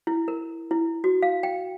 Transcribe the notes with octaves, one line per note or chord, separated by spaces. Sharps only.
E4
A#4
E4
F#4
F5
G5